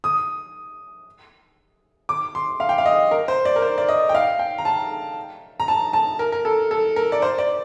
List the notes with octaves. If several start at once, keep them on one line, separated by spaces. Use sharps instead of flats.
D#6
D6
C6
F5
G5
F5
D#5
A#4
C5
D5
A#4
C5
D5
D#5
G5
F5
G5
A#5
A5
A#5
A5
A5
A#4
A#4
A4
A4
A#4
D5
C5
D5